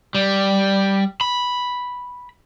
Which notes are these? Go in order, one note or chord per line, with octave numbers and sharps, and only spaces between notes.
G3
B5